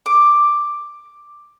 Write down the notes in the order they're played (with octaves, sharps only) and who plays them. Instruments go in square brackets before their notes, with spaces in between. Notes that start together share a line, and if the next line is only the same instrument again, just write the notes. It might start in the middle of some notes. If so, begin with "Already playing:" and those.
[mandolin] D6